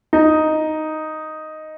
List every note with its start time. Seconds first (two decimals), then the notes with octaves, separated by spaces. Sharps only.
0.13 D#4